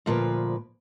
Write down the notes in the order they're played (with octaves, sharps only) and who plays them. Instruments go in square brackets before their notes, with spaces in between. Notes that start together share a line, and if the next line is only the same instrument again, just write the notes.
[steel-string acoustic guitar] D2 A#2 F3 B4